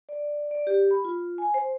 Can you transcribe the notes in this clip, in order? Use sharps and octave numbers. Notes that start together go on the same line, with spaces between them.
D5
D5
G4
B5
F4
G#5
C5